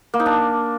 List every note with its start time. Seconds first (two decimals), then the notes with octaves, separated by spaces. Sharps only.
0.14 A#3
0.20 D#4
0.26 D4